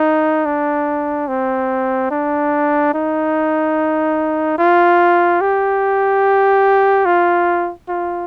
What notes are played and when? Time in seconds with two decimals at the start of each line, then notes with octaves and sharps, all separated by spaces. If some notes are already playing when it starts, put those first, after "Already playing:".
Already playing: D#4
0.45 D4
1.28 C4
2.11 D4
2.94 D#4
4.58 F4
5.41 G4
7.06 F4
7.89 F4